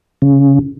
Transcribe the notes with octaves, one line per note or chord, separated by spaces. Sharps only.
C#3